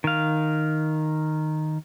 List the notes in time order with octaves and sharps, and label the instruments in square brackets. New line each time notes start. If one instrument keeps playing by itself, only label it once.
[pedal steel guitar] D#3 F5